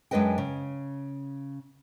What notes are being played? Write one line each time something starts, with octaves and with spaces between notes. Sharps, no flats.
F#2 G#3 D4 B4 D#5 G5
C#3